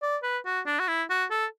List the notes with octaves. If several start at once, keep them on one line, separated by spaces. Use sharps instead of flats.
D5
B4
F#4
D4
F#4
E4
F#4
A4